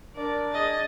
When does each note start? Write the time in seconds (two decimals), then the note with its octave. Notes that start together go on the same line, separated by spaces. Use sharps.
0.15 D4 A#4 D5
0.52 G#4 D#5 A6